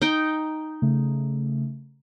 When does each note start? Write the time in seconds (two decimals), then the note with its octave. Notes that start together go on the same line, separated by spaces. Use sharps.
0.02 D#4 G5
0.82 C#3 A3